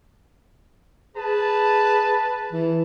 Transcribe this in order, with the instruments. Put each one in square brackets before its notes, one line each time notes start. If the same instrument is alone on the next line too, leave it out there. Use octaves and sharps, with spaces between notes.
[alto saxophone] G#4 [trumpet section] B4 A5
[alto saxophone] E3